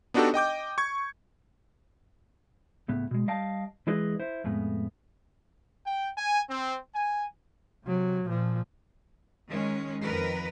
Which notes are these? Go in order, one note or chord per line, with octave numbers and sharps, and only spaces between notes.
B3 D4 D#4 F#4 G4 A4
D#5 G5 D6 G6
C#6 G#6
C#2 A2 B3
B2 G#3
G3 D#5 F5 G5 A5
E3 G#3 E4 G#4 B4 D#5
E4 C5
F2 A2 G#3 B3
G5
G#5
C4
G#5
C3 F#3
A#2 F3
D#3 G#3 C#4
F2 D#3 A#4 B4